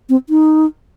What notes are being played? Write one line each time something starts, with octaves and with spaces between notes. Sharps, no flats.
C4
D#4